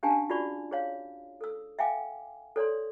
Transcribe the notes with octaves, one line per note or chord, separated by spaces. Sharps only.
C#4 D4 G4 F5 G#5 A5
F4 F#4 G#4 D5 B5 C#6
G#4 C#5 F5
A4 E6
E5 F5 G5 G#5 D6
A4 C#5 D5 C6